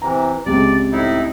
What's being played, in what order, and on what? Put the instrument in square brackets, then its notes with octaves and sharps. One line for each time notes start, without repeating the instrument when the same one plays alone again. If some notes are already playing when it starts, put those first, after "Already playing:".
[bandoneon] C3 E3 [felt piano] A#5
[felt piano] C#2 C3 [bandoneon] D5
[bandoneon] A2 D#4 E4